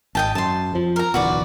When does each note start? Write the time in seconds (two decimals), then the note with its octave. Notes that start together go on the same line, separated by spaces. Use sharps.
0.15 G#1 D#5 G5 A5
0.35 F#2 A5 C6
0.73 F2 F3
0.96 A#4 A#5
1.14 D1 B1 E3 F#4 B4 D5